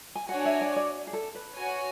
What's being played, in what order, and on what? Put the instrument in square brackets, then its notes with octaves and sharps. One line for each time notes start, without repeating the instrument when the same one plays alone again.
[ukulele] G#5
[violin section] D4 F#4 C#5 G#5 [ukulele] F#5
[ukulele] E5
D5
D5
G#4
A4
B4
[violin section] F#4 C#5 G#5